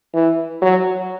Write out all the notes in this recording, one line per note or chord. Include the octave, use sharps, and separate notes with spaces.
E3
F#3